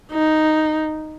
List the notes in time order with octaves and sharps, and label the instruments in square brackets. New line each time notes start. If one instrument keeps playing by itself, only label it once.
[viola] D#4